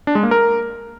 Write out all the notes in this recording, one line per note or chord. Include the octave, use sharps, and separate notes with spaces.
D4
G#3
A#3
A#4